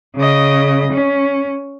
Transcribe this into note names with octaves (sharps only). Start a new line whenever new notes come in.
C#3 D#5
C#4